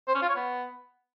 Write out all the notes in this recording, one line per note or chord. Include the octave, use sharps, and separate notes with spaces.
C5
C#4
F4
C#5
B3